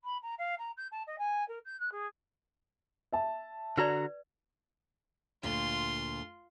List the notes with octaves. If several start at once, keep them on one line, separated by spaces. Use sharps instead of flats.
B5
A#5
F5
A#5
G6
A5
D#5
G#5
A#4
G6
F#6
G#4
E5 A5
D3 F#4 B4 D5 A#5
D2 A#2 F4 C6